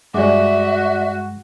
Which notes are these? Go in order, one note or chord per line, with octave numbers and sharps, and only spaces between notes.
G2 G#3 F#4 D5 E5 D6